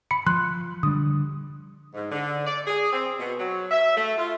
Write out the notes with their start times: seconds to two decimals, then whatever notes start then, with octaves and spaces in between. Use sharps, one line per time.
0.11 B5 C#7
0.27 F3 C6 F#6
0.83 D3 G3 D#6
1.94 G#2
2.11 D3
2.46 D5
2.67 G#4
2.93 C4
3.20 B2
3.39 F#3
3.71 E5
3.97 A3
4.18 F4